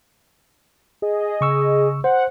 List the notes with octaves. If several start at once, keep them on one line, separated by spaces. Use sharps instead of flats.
G#4 D#5
C#3 C#6 E6
C5 F#5